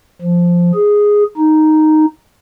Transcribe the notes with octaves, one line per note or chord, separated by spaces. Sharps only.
F3
G#4
D#4